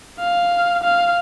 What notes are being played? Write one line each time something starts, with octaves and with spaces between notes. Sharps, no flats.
F5
F5